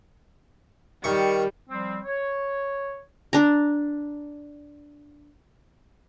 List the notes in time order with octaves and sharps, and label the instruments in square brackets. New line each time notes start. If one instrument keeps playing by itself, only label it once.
[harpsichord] D#3 C#6 [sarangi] G3
[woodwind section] F3 G3 C4
C#5
[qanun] D4 A#5